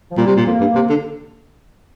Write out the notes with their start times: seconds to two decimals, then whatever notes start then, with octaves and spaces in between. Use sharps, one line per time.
0.11 F3
0.17 A#2 G3
0.26 C3
0.36 A#2
0.46 F2 A#3
0.60 G2
0.75 C3
0.89 D3